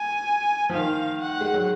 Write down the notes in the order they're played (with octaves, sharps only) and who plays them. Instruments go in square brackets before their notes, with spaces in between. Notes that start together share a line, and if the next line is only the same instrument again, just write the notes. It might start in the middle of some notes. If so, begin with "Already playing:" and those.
Already playing: [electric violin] G#5
[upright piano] F3
[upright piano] D#3 [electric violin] F5
[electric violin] F#5
[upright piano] G#3
F#3